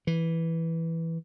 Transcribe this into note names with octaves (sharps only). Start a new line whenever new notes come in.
E3